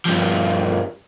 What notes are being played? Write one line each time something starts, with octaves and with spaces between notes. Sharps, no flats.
G2 F3